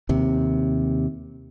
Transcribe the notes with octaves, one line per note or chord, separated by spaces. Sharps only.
D#2 C3